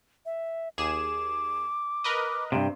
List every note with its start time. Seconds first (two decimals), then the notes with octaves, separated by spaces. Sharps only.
0.26 E5
0.78 D#2 G#4 D6 E7
2.04 A#4 B4 D#5
2.52 G2 C3 G5